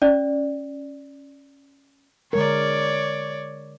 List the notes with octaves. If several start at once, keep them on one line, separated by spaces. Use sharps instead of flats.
C#4 D5
D3 G#3 A#4 C#5 D5